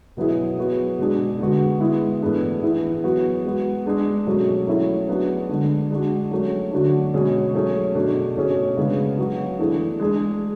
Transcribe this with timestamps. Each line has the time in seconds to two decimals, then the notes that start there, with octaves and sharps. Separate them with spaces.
0.17 B2 F#3 B3 E4 G#4
0.58 F#3 B3 F#4
0.98 B2 G#3 D4 G#4
1.39 D3 G#3 B3 F#4
1.80 G#3 B3 E4
2.22 A2 E3 B3 D4 G#4
2.63 E3 B3 E4 G#4
3.04 F#3 B3 F#4
3.44 G#3 B3 F#4
3.86 G#3 D4 G#4
4.27 B2 F#3 A3 C#4
4.67 F#3 A3 C#4 E4 G#4
5.09 F#3 B3 D4 F#4
5.49 D3 G#3 D4
5.90 G#3 D4 F#4
6.31 F#3 A3 C#4
6.72 D3 F#3 A3 D4 F#4
7.13 B2 G#3 C#4 G#4
7.54 F#3 A3 C#4 G#4
7.95 B2 A3 D4
8.36 B2 A3 C#4 G#4
8.77 C#3 G#3 B3 D4
9.18 F#3 B3 F#4
9.58 E3 A3 D4 G#4
9.99 G#3 D4 G#4